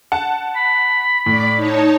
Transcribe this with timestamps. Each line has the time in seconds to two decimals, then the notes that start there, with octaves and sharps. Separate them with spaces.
0.12 F#5 A5
0.56 B5
1.26 A2 D5 D6
1.56 D#4 C#5 A5